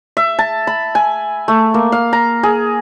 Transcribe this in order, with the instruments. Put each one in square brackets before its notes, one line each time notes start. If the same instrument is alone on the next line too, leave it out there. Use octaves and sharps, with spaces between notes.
[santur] E5
A5
B5
G#5
A3
A#3
F5
A#5
G#4